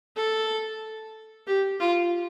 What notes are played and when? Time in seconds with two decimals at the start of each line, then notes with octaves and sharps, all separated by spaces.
0.17 A4
1.48 G4
1.80 F4